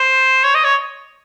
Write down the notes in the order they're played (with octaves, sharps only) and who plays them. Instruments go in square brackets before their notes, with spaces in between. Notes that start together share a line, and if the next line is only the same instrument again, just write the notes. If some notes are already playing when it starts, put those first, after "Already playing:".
Already playing: [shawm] C5
C#5
D#5
C#5